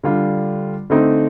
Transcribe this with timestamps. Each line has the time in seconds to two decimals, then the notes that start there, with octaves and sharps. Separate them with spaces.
0.03 D3 G3 D4 F4
0.90 D3 A3 C4 D#4